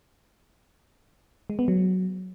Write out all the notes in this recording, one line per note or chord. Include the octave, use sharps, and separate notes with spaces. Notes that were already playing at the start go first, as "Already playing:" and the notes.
G#3
B3
F#3